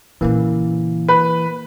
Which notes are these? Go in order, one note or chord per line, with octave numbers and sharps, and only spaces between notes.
A#2 C#3 E3 A#3
B4